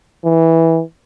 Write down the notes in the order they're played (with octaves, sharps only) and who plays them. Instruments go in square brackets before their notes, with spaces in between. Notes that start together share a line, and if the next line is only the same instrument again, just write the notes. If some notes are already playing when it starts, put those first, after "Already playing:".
[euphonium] E3